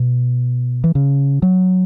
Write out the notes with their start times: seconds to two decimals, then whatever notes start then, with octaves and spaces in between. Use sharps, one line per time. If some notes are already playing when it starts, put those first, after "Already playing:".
Already playing: B2
0.84 E3
0.95 C#3
1.42 F#3